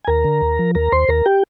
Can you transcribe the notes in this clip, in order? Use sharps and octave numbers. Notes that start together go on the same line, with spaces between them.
G#5
D#2 A#4 A#5
D3
D#2
F3
D#2 A#4 A#5
D#2 C5 C6
D#2 A#4 A#5
G4 G5